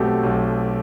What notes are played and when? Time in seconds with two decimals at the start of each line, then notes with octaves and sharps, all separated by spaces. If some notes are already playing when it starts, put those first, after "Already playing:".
Already playing: B1 B2 A3 C4 G4
0.23 B1